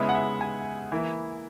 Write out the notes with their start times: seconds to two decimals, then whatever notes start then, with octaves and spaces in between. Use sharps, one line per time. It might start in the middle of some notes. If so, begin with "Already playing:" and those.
Already playing: C#3 G#3 B3 E4
0.09 F#5
0.15 E5
0.41 G#5
0.92 E3 A#3 E4